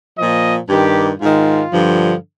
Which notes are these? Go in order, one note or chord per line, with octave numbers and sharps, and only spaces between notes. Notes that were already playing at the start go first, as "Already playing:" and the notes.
A#2 F3 D#5
G2 D#3 G4
G#2 D#3 F4
G2 D3 F3